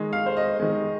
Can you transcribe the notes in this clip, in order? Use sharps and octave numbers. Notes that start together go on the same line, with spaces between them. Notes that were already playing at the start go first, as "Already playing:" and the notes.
Already playing: D#3 G#3
F5
C5
D#5
D#3 G#3